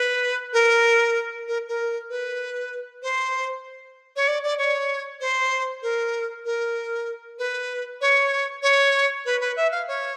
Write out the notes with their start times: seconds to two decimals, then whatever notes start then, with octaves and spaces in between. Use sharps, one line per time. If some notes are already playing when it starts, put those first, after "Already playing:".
Already playing: B4
0.53 A#4
1.47 A#4
1.68 A#4
2.09 B4
3.02 C5
4.16 C#5
4.27 D5
4.43 D5
4.58 C#5
5.20 C5
5.82 A#4
6.45 A#4
7.38 B4
8.01 C#5
8.62 C#5
9.25 B4
9.40 B4
9.56 E5
9.71 F5
9.87 C#5